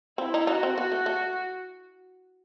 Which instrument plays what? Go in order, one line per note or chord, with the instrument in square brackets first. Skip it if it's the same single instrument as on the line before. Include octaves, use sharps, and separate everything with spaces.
[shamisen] C4 [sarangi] E4
[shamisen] D#4
[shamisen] D#4 [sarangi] F#4
[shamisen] C4
[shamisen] B3 [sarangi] F#4
[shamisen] A3
A3